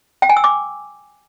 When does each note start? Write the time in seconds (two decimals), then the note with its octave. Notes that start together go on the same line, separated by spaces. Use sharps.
0.22 G5
0.29 G#5
0.37 E6
0.44 D6